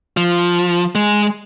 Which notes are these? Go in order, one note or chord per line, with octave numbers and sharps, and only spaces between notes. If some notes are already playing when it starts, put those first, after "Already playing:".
F3
G#3